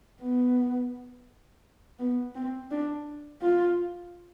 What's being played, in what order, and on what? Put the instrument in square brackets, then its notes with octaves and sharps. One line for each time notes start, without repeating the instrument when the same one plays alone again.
[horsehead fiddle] B3
B3
C4
D4
F4